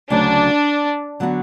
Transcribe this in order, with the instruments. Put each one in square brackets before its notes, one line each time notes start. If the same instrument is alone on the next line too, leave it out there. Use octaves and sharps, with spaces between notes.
[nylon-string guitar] D2 C#3 F#3 [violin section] D4
[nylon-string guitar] D3 F#3 B3 F#4